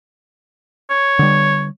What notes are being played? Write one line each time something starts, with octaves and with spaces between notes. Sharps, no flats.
C#5
D3 G3